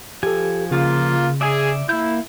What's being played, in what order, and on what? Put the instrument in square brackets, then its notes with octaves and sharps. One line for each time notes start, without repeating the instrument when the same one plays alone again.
[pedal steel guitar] F3 G#5 [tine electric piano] G4 A4
[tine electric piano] C#3 [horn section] A#3 F4
[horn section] G#4 [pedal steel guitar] D5 E5
[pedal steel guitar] A#3 G6 [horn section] E4